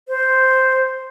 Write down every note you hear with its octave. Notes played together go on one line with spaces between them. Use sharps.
C5